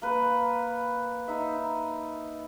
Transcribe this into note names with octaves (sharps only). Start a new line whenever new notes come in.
A#3 B4
D#4 E5